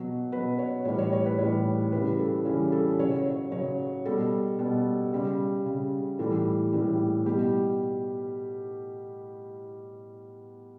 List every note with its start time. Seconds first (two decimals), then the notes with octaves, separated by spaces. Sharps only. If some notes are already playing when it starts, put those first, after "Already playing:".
Already playing: B2 F#3
0.32 B2 F#3 B4
0.59 C#5
0.85 A2 E3 G3 C#5
0.98 C#5
1.13 C#5
1.26 B4
1.38 A2 E3 G3 C#5
1.92 C#3 E3 G3 B4
2.19 A4
2.45 C#3 E3 G3 C#4
2.72 A4
2.99 C#3 F#3 C#5
3.26 C#5
3.52 C#3 F#3 C#5
4.05 B2 G3 A4
4.59 B2 G3
5.13 C#3 G3
5.66 C#3 G3
6.19 A2 E3 G3 A4
6.73 A2 E3 G3
7.26 B2 G3 G4